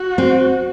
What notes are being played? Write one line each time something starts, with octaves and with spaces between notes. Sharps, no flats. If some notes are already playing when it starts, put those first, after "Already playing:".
Already playing: F#4
C4